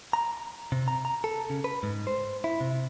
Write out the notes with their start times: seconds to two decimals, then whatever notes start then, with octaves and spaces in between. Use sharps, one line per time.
0.13 A#5
0.72 C3
0.88 A#5
1.05 A#5
1.24 A4
1.50 C#3
1.64 B4
1.83 G#2
2.07 C5
2.44 E4
2.61 C3